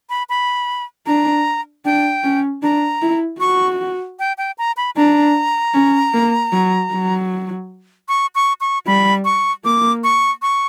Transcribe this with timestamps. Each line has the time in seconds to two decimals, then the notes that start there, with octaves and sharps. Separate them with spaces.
0.10 B5
0.29 B5
1.06 D4 A#5
1.85 D4 G5
2.23 C#4
2.62 D4 A#5
3.02 E4
3.40 F#4 C#6
4.19 G5
4.38 G5
4.58 A#5
4.77 B5
4.96 D4 A#5
5.74 C#4
6.14 A#3
6.52 F#3
6.92 F#3
8.08 C#6
8.35 C#6
8.61 C#6
8.87 G3 B5
9.25 C#6
9.64 A#3 D6
10.04 C#6
10.42 C#6